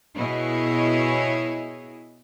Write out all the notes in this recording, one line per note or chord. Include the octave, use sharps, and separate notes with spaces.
B2 E4 G#4 C#5 D#5